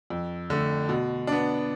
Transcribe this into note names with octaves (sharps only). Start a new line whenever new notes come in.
F2
D3 A3
B2
B3 D4